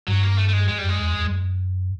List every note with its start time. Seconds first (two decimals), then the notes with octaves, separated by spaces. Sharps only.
0.08 G2 F#3
0.23 A#3
0.38 A3
0.48 A3
0.53 G#3
0.68 F2 G#3
0.78 F#2 G3
0.89 G#3
0.99 E2
1.14 F2
1.24 F2
1.29 F#2